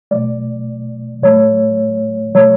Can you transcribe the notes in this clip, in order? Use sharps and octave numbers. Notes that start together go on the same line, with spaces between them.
B2 F#3 A3 D5
A2 F#3 A3 C#5
B2 F#3 A3 C#5